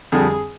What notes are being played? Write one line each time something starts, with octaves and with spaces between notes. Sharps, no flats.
F2 D3 G3 G#4